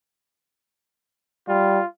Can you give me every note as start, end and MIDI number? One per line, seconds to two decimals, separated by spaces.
1.48 1.79 55
1.48 1.86 65